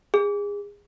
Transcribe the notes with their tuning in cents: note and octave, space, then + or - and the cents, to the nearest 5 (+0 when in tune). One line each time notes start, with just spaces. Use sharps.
G#4 -30